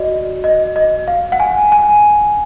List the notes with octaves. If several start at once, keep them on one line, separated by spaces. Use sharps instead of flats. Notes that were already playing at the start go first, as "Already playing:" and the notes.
Already playing: F#4 D5 D#5
D#5
D#5
F5
F#5
G#5
G#5